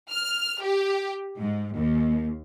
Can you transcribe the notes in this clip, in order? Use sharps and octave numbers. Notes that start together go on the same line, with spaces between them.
F6
G4
G#2
D#2